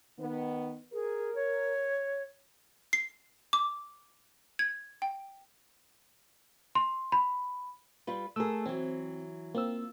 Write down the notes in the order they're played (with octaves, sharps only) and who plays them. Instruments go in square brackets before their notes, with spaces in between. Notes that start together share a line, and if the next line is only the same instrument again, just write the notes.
[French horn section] D#3 B3
[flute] G#4 [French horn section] A#4
[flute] C#5
[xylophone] C7
D6
G#6
G5
[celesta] C6
B5
[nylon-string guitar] G3 F4 B4
[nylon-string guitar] A3 G#4 [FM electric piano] A#4 E6
[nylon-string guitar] E3 F#3 [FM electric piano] C4
[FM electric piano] A#3 C4 E6 [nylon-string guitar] F4